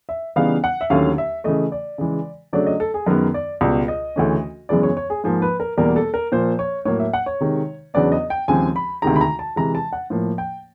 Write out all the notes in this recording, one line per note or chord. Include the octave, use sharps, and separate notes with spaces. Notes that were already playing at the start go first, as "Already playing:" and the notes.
E5
C#3 E3 G3 B3 D#4 F5
F#5
E5
D#2 D3 F#3 A3 C#4 F5
E5
C#3 E3 A3 D#5
D5
C#3 E3 G#3
C#3 F#3 A3 D4 D5
D#5
A4
G#4
F#2 D#3 G#3 B3 A#4
D5
C#2 B2 G3
D#5
D2 C#3 E3 A3 C#4
F#2 C#3 E3 G#3 B3 D5
C#5
C#5
G#4
G#2 F3 A#3 G#4
B4
A#4
E2 B2 G3 A#3 A#4
A4
A#4
A#2 F3 A#3 C5
C#5
A2 F#3 A#3 C#5
E5
F#5
C#5
C3 D#3 G#3
E2 C#3 F#3 B3 D4 D5
D#5
G5
D#2 C#3 F3 G#3 C4 G#5
B5
D2 C3 D#3 G#3 A#5
B5
A#5
A5
C3 E3 G#3 A#5
A5
F#5
A2 F3 A#3
G5